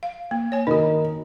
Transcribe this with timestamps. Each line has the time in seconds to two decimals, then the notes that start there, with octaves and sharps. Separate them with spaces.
0.03 F5
0.31 A#3
0.52 C#5 G#5
0.67 D#3 D#4 F#4 A#4